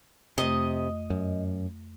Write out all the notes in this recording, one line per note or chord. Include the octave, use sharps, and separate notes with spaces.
F2 C3 A3 D#5
F#2